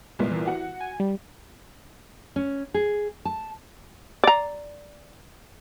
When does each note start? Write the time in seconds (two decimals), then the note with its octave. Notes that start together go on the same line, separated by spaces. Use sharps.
0.19 C2 A#2 G#3 B3
0.32 E3
0.46 F#4 F#5
0.81 G#5
1.00 G3
2.36 C#4
2.74 G#4
3.25 A5
4.24 D5 A#5